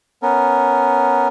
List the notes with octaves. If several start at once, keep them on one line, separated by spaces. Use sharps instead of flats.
B3 C#4 A#4